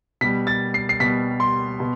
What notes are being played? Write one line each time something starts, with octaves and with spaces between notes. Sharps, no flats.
B2 G3 B6
A6
C7
C7
B2 G3 B6
C6
B2